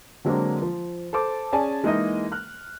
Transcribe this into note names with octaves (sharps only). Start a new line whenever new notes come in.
D3 F#3 G#3 A#3 C4 D4
F3
A4 C5 A5 D6
C#4 G#4 D5 G#5 A5
E3 G#3 A#3 D#4 E4 D#5
F6 F#6